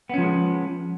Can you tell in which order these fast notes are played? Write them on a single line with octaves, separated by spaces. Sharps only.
B3 C#4 F3 G#3